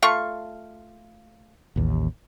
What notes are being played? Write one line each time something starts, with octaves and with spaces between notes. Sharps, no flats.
A3 F4 C#6
A1 D#2